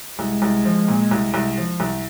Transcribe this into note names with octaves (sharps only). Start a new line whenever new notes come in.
C2 G#3
C2
F3
A#2
C2
C2
F3
C2